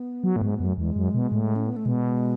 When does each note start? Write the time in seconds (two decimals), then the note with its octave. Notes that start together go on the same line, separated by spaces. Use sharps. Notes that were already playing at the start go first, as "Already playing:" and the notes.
Already playing: B3
0.24 F#3
0.36 A2
0.42 G#2
0.55 B3
0.60 F#2
0.66 A3
0.77 E2 G#3
0.96 F#2
1.14 B2
1.32 A2
1.56 C#4
1.66 B3
1.76 A3
1.85 B2 G#3